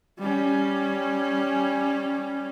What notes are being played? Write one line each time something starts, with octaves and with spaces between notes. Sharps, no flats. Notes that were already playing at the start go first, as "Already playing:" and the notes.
G3 C#4